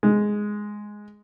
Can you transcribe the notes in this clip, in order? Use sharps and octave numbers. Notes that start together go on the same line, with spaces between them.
G#3